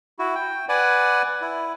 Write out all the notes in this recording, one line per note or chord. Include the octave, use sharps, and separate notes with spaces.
E4 F#4
G5
B4 D5 F#5 G#5
E4